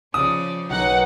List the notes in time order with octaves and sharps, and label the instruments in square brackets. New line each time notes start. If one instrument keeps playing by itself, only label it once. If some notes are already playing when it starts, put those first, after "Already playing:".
[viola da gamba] C#3 F3 D5 [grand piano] D#6
[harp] B1 A#4 [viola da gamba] D#4 [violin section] F#5